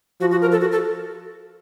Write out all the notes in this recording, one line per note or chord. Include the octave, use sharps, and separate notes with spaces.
F3 F#4
F#4
A#4
A4
F#4
A4